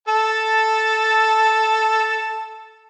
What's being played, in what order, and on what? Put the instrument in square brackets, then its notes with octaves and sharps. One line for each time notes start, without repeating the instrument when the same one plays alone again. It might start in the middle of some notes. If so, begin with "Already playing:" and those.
[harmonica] A4 A5